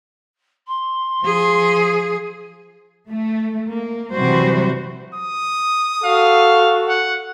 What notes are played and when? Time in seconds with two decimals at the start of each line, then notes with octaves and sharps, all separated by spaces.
0.67 C6
1.22 F3 G#4
3.10 A3
3.71 A#3
4.13 C3 E3 F#3 G3 F#4 C5
5.15 D#6
6.04 F#4 A4 F5
6.89 F#5